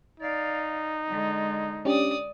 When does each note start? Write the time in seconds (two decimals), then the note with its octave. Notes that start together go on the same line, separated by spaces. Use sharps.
0.20 D#4 D5 F5
1.08 D3 G#3
1.85 C#4 D4 G4 D5 D#6